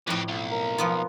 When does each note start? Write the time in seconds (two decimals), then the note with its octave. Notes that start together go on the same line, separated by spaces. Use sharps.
0.07 F2 A2 E3 C4
0.28 B1
0.51 A#4
0.78 F3 B3 F4